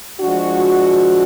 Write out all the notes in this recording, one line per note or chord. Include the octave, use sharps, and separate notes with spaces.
F3 G#3 D4 F#4